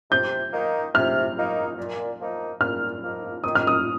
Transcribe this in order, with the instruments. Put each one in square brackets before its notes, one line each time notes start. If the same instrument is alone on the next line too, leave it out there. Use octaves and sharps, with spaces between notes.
[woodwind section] C3 [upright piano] G6
[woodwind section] D#3 A#3 D#4
[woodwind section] C3 [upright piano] F6
[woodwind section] D#3 A#3 D#4
A#2
F3 A#3 D#4
[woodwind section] A#2 [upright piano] F6
[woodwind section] F3 A#3 D#4
[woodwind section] D#3 [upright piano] D#6
[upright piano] F6
D#6